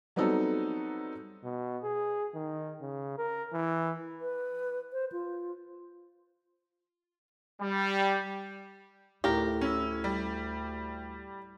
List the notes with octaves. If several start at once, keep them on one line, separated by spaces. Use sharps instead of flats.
F#3 G3 B3 C4 D#4 A4
B2
G#4
D#3
C#3
A#4
E3
B4
C5
F4
G3
D2 A2 G4 A#4
C#4 E4
G3